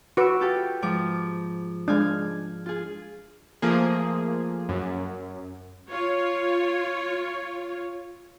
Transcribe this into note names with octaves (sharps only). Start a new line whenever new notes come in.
F#4 B4 D6 E6
F4 G4 A4
G#2 F3 D6
G#3 D4 F5 G#5
F4 G#4
F3 A3 A#3 G#4
F#2
F4 C#5